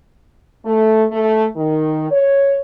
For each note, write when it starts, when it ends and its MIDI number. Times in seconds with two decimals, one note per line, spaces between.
0.66 1.05 57
1.11 1.47 57
1.56 2.09 51
2.11 2.60 73